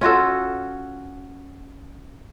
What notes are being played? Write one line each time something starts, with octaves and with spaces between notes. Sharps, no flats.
C#4 F4 F#4 A4